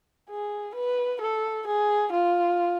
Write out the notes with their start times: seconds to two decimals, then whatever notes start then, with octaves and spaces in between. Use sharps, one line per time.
0.30 G#4
0.75 B4
1.21 A4
1.67 G#4
2.12 F4